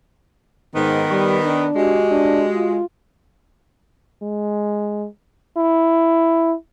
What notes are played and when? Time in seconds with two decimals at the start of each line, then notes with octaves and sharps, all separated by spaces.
0.76 G#2 D#3 B3
1.11 G3 C#6
1.44 D4
1.76 G#3 F#4 G4
2.11 D4
2.55 F4
4.22 G#3
5.57 E4